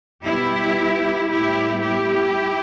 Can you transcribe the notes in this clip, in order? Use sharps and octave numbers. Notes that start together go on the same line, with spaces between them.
B2 G3 B3 E4 G4
A2 G3 B3 E4 G4
E4 G4